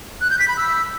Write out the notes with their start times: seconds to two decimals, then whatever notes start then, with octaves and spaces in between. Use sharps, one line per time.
0.21 F#6
0.30 G6
0.39 B6
0.48 B5
0.57 E6